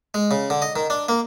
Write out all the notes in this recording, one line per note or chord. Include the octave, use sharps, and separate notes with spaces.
G#3
C#3
D3
D#5
D#3
D4
A#3